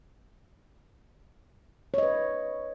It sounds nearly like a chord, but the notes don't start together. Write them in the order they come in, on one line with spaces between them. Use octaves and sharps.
C#5 D#5 B4